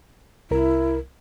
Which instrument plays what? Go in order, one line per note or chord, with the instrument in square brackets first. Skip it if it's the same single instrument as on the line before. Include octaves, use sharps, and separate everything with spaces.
[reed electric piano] C2 A#4 [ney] E4